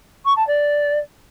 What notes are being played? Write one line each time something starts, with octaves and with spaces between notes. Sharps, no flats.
C#6
A5
D5